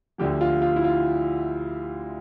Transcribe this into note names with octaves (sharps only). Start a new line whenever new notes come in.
D2 D3 F3 G4
F4
F4
E4
F4